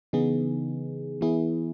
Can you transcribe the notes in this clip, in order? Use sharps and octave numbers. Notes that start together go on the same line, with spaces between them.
C#3 E3 B3 D#4 G#4
E3 B3 E4 G#4